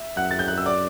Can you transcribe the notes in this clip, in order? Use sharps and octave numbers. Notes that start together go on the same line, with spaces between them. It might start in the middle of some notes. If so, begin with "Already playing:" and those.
Already playing: E5
F#2 F#5 F#6
A6
G6
F#6
E6
D5 D6